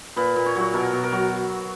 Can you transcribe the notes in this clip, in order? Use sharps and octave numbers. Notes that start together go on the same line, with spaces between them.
A#2 B4
A#2
C#5
F#3 F#4
B2 A#4
B2
A#4
F#3